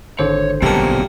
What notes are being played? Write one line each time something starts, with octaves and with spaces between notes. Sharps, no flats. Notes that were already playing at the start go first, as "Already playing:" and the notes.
G#1 D3 C5 C#5
B1 F#2 A#2 G3 A#3 C4 A5